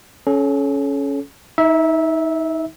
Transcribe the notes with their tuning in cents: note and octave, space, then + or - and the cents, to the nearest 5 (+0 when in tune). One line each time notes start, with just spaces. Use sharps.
C#4 +5 A4 -35
D#4 +30 E5 -15